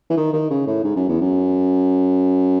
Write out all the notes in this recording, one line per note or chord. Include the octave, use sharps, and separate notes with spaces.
E3
D#3
D#3
C#3
A2
G#2
F#2
E2
F#2